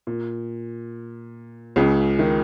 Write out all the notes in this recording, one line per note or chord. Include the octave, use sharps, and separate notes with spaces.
A#2
C#2 C#3
D#3